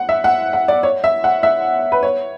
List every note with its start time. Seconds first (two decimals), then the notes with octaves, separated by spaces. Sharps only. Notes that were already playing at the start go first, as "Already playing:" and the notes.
Already playing: F#5
0.09 E5
0.24 F#5
0.53 F#5
0.68 D5
0.83 C#5
1.04 E5
1.24 F#5
1.43 E5
1.92 B4
2.03 C#5